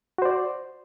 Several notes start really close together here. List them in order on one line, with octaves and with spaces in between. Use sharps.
F#4 C5 D5